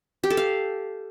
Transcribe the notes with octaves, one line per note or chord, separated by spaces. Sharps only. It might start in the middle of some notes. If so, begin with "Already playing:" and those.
G4
A4
F5